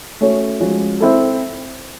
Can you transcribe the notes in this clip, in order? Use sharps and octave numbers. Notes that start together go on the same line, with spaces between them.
A3 C#4 F#4 A4 C#5
F3 G#3 C#4 F#4
C4 E4 A4